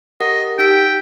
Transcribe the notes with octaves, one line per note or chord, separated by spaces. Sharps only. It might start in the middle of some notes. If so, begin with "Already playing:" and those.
G4 A#4 D#5 F#5
D#4 G4 G5 E6 B6